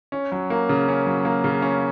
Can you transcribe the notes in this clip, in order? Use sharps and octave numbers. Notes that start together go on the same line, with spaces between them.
C#4
F#3
A#3
C#3
C#4
F#3
A#3
C#3
C#4